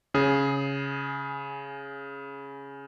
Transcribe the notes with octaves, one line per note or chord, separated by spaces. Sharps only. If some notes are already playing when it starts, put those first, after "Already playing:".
C#3 G#4